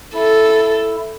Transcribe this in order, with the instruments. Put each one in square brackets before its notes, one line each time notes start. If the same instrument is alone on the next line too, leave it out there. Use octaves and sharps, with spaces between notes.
[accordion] E4 [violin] A4